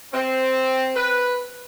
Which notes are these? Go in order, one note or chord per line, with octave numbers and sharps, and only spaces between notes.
C4
B4